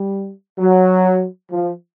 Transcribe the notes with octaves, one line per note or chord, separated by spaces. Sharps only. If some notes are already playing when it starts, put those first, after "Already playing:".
Already playing: G3
F#3
F3